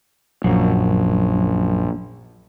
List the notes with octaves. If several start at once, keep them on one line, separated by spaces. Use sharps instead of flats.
A#1 F#2